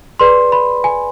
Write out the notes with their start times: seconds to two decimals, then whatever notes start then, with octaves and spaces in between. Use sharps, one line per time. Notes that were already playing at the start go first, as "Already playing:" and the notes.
0.20 G#4 B4 D5 C6
0.52 B5
0.84 G#5